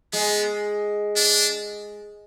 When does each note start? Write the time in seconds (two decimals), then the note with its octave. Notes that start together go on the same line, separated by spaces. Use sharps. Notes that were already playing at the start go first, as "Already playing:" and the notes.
0.13 G#3 B3
1.16 D4